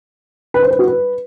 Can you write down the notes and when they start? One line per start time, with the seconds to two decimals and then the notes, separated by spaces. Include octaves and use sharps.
0.54 B4
0.62 C5
0.71 B4
0.79 F#4
0.87 B4